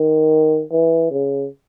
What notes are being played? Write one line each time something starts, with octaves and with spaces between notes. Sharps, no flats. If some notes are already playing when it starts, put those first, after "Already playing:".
Already playing: D#3
E3
C#3